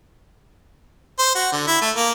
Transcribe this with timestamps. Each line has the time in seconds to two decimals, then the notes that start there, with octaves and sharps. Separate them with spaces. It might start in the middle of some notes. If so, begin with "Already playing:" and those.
1.19 C5
1.35 F#4
1.52 D3
1.67 E4
1.81 A3
1.96 A#3